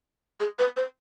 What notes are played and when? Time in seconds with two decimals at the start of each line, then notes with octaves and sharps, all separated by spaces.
0.40 G#4
0.59 B4
0.77 C5